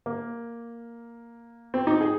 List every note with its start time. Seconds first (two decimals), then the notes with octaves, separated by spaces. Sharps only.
0.06 A#3
1.74 C4
1.87 D#4
2.01 G#4